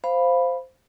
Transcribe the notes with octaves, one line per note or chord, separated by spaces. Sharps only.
C5 F5 B5